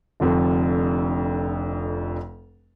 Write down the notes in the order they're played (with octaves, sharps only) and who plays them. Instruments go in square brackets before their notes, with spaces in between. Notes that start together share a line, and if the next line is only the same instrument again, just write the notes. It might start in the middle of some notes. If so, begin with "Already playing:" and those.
[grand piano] F1 F2 D3 D4